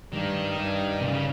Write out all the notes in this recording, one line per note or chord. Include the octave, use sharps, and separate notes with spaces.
G2 D#3
G2
C3
C#3